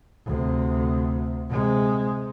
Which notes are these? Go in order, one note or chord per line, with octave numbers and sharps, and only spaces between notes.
D2 C3
C3 G#3